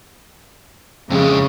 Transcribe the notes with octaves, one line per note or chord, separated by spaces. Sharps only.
F2 C#3 G#3